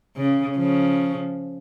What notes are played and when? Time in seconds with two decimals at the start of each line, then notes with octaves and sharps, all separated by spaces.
0.17 C#3
0.57 C#3 F3